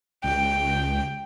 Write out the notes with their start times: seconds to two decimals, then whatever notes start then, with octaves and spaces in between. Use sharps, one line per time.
0.24 C#2 G5